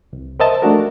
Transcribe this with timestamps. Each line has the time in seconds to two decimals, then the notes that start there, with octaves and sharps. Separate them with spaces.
0.13 C2
0.40 A#4 C5 D#5 E5 A5
0.62 A3 D4 F#4 A#4